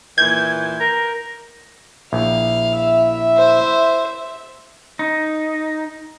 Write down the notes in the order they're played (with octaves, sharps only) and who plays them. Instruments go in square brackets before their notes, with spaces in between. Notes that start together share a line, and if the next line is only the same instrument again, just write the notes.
[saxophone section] D#2 A#2 E3 [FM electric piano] G6 [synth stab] G#6
[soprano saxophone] A#4
[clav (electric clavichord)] A#1 [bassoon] E4 [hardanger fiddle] F5
[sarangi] E5
[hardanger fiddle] C5
[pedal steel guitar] D#4